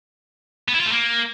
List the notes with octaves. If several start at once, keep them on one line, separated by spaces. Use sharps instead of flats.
B3
E4
F4
A3
A#3